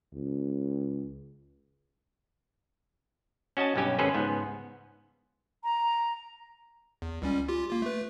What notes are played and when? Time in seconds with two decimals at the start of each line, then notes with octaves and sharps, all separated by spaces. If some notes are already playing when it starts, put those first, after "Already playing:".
0.13 C#2
3.57 C#4 F#4 D#5 G#5 A5
3.76 B1 G2 C#4 G4 G#5
3.98 G#1 C#4 G#4 A4 B4 C5
4.14 C#2 G#2 B3
5.63 A#5
7.02 E2
7.22 C#2 G3 C#4
7.49 F4 G4
7.70 A#3 F4
7.82 A3 B4